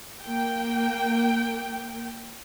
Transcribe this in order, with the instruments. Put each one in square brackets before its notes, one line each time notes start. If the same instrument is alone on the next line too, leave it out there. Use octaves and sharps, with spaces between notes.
[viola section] A#3 G5